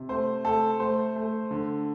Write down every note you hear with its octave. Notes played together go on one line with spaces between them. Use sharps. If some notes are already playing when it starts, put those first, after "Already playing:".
Already playing: C3
A3 C5
A3 A4
A3 C5
A3
D3